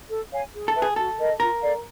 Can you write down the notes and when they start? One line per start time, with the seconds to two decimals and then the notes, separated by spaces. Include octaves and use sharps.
0.10 A4
0.32 C#5 F5 G#5
0.53 G#4
0.68 A4
0.75 B4 E5 A5
0.82 G#4
0.96 F#4 A4
1.19 A#4 D#5
1.40 F4 A#4
1.61 A4 D5 F5